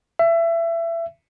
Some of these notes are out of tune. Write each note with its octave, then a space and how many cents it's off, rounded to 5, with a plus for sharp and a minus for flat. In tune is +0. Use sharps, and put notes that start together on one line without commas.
E5 +25